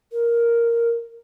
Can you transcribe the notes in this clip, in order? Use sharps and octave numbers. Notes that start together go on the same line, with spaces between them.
A#4